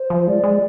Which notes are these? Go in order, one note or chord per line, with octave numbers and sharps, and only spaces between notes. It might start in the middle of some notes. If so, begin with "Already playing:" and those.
Already playing: C5
F3
G#3 D5
G#3